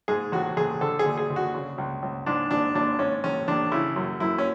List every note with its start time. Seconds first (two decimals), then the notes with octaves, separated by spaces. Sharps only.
0.08 G#2 G#4
0.32 A1 F#4
0.57 A1 G#4
0.81 D3 A4
0.99 G#4
1.06 D2
1.17 G#4
1.30 D2
1.36 F#4
1.55 C#3
1.78 C#2
2.02 C#2
2.26 G#2 D4
2.50 G#1 D4
2.75 G#1 D4
2.99 G#2 C#4
3.24 A1 C#4
3.48 A1 D4
3.72 C#3 E4
3.96 F#2
4.20 F#2 E4
4.38 C#4